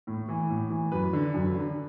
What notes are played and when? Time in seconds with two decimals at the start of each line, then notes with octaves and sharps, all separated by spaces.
0.07 A2
0.29 E3
0.50 A2
0.70 E3
0.92 F#2 B4
1.13 D3
1.34 F#2
1.55 D3